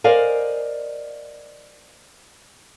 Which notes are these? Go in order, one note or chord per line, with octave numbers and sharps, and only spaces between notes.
A#4 C5 D5 D#5 F5 G#5